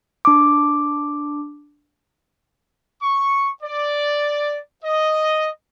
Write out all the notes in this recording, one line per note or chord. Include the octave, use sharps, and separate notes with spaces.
D4 D6
C#6
D5
D#5